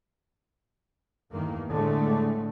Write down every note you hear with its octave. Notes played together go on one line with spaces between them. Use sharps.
E2 G2 D#3 A3 A#3
A2 D3 G#3 A3